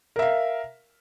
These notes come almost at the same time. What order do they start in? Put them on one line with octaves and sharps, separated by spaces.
A#4 E5 F5